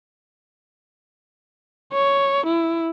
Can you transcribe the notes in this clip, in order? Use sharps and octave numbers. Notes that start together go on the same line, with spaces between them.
C#5
E4